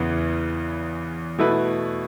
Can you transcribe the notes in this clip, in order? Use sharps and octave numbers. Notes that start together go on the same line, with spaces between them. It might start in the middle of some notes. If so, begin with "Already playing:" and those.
Already playing: E2 C#3 E3 B3
B2 A3 E4 B4